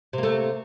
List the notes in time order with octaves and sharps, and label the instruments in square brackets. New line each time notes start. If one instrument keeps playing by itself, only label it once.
[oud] C3
A#3
A3